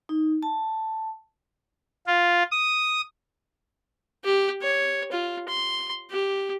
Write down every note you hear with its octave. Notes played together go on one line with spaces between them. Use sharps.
D#4
A5
F4
D#6
G4
C#5
F4
C6
G4